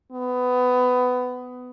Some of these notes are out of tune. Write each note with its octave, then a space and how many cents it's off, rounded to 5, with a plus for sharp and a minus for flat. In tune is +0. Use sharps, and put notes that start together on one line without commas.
B3 +20